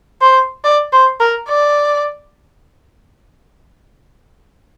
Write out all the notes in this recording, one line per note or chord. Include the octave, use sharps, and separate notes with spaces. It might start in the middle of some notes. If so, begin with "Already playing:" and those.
C5
D5
C5
A#4
D5